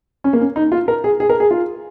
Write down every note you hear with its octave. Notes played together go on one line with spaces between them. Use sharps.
C#4
A#3
C#4
D#4
F4
A#4
G#4
G#4
A#4
G#4
F4